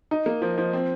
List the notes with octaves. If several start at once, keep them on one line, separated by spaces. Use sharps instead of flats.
D#4
A#3
F3
F3
C4